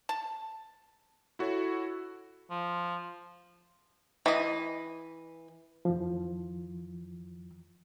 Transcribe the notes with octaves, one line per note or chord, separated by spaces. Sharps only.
A5
E4 F#4 A4 C#5
F3
E3 D#5
F2 E3 F3